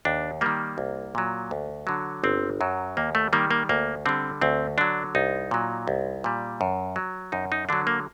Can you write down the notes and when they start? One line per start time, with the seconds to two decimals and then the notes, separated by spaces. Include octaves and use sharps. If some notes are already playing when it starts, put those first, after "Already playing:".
0.05 D#2 D4
0.41 D#3 G3 A#3
0.78 C2
1.15 A#2 F#3
1.51 D2
1.87 D3 F#3
2.24 G1 C4
2.61 F#2 F#3
2.97 D#2 A#3
3.15 A3
3.33 D#3 G3 A#3
3.51 A#3
3.69 D2 A#3
4.06 D3 G3 C4
4.42 D2 C4
4.78 D3 F#3 D4
5.15 C2 D#4
5.51 A#2 F#3
5.88 C2
6.24 A#2 G3
6.61 F#2
6.96 F#3
7.32 F#2 D#4
7.52 D#4
7.69 D3 F#3 D4
7.87 A#3